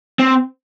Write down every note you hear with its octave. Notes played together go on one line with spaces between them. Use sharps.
C4